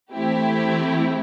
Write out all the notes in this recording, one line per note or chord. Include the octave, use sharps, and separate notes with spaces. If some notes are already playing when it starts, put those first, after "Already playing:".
E3 A3 C4 E4 G4